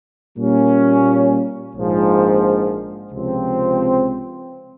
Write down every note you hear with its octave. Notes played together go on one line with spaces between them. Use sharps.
A#2 G3 A#3 C#4
A#1 G#2 F3
C#2 C3 F3 C4